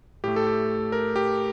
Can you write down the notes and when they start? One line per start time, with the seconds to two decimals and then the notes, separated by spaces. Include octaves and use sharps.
0.24 A2 A3 G4
0.36 A4
0.47 G4
0.92 A#4
1.16 G4